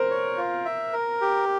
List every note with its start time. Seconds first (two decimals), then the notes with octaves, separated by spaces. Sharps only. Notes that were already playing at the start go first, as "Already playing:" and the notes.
Already playing: A#4 C5
0.10 C#5
0.37 F4
0.65 E5
0.93 A#4
1.21 G4